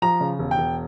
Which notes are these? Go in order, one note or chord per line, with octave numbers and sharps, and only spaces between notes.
F3 A#5
C#3
E1
G5
E1